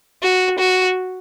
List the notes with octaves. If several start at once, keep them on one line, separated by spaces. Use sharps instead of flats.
F#4
F#4